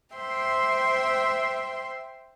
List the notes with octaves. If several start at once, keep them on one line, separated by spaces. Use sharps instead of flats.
C5 E5 G5 C6